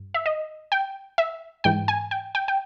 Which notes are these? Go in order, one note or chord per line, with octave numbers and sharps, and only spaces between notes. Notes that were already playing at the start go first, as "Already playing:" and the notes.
Already playing: G2
E5
D#5
G5
E5
G#2 E3 G5
G#5
G5
G5
G5